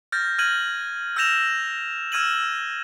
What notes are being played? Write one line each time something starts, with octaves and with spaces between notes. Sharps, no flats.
F6 G6 A6 A#6
F6 G#6 D#7 F#7
E6 F6 G6 A#6 E7 F7
E6 F6 G#6 D#7 E7 F#7